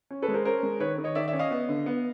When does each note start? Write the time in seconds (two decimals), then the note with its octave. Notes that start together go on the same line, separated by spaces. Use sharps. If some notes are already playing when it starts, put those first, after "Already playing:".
0.11 C#4
0.22 A4 B4
0.28 G#3
0.34 A#4 C5
0.45 C#4 A#4 C5
0.63 G#3
0.80 D#3 B4 C#5
0.98 D#3
1.04 C#5 D#5
1.15 D#3 D5 E5
1.28 D5 E5
1.33 C#4
1.39 D#5 F5
1.51 B3
1.69 D3
1.86 B3